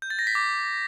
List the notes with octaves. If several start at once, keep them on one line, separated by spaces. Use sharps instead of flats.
G6
A6
A#6
B6
D6